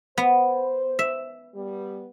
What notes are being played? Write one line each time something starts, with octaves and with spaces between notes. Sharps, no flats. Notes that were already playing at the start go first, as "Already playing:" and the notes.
B3 C5
E5
G3 B3